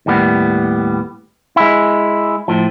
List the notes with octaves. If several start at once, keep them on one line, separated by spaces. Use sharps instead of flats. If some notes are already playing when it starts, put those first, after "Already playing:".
D#2 A2 G3 B3
G#3 E4
A2 F3